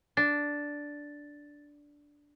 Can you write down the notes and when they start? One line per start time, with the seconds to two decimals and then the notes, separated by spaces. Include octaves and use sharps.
0.17 D4 A6